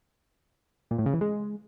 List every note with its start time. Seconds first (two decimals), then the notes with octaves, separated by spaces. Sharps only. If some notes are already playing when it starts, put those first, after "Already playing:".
0.91 A#2
0.98 A2
1.06 C#3
1.14 E3
1.21 G#3